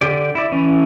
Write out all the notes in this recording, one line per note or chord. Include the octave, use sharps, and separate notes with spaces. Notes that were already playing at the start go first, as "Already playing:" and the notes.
D3 G4 D5
E4 D5
E3 C#4